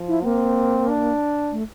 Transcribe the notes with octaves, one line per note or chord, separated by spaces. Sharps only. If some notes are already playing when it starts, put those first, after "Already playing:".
Already playing: F3
E4
A#3 C4
D4
A3